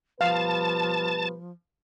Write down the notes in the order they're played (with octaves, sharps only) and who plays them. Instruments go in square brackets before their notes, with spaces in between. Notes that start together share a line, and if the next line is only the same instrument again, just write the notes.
[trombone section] B2 G3 B4 [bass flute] F3 [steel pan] F5 [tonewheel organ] A5